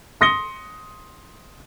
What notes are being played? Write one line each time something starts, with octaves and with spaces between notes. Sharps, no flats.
C6 D#6 A#6 C#7 G7